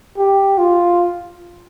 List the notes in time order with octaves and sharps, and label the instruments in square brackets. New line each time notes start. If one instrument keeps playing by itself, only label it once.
[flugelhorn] G4
F4